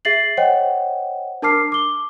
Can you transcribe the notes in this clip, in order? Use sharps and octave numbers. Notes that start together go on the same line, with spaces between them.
G#4 E5 A6 C7 F#7
C5 C#5 D#5 F#5 G5
D4 A#4 A5 D6 F6 C7
D6 G7